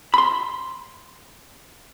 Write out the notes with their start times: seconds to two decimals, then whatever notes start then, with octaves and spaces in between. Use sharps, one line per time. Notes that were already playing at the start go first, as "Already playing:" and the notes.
0.14 B5 C6